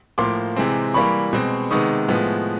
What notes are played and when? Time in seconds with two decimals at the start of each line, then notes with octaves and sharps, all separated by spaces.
0.18 A2 F3 A#3 C6 D6
0.56 C3 E3 G#3 C4
0.94 E3 G3 A#3 B5 C#6
1.33 B2 G#3 C4
1.71 C3 D#3 G#3 B3 C#6 D#6
2.08 A2 F3 G#3 B3